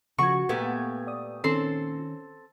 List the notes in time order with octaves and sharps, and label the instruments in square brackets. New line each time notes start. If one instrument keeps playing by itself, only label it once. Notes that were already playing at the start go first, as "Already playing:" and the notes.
[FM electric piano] C#3 F3 G#6 [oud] F#4 [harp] C#6
[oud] A#2 B3 [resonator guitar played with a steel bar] A3 G4 [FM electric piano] G#6
[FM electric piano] D5 D#6
[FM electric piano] D#3 C#4 [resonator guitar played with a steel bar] C4 A4 [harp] C7